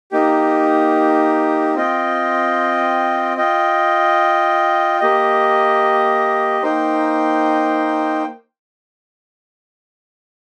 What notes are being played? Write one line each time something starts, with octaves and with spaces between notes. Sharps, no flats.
A#3 D#4 G4
C4 F4 D#5 G5
F4 D#5 G5
A#3 G4 D#5
A#3 D#4 C5 G5